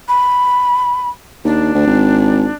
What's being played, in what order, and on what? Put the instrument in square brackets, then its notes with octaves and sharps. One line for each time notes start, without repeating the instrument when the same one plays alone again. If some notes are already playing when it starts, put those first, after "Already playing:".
[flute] B5
[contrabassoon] D#2 [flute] D4
[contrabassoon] D2
G#1